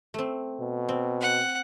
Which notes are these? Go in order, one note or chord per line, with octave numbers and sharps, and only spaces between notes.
A3 C4
B2
C4
F#5